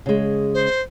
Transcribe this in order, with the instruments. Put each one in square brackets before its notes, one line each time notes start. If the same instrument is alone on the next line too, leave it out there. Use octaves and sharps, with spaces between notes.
[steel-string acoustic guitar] C#3 G#3
[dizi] C5